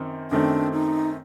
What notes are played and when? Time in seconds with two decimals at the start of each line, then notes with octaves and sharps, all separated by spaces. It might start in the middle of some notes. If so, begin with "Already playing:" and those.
Already playing: F#2 D#3 C4
0.31 F#2 D#3 A3 C4 D4
0.72 D#4